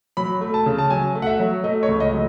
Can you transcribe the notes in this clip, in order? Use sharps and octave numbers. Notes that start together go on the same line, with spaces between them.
F#3 B5
A3
A5
C#3
A5
F#3 G#5
A3
F#5
E5
F#3
A3 D#5
C#5
C#2
D#5
F#3